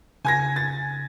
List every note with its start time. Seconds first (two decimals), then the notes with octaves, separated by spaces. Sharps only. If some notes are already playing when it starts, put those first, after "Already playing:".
0.25 C#3 G#5 G#6 A#6
0.56 A6